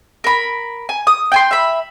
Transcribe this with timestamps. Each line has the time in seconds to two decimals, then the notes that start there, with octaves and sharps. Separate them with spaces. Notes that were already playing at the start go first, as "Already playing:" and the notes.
0.24 A#4 B5
0.89 G#5
1.07 D#6
1.32 G5 G#5 C6
1.51 E5 B5